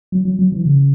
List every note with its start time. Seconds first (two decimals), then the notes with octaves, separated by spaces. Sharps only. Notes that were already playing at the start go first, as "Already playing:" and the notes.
0.12 F#3
0.25 F#3
0.39 F#3
0.52 E3
0.65 C#3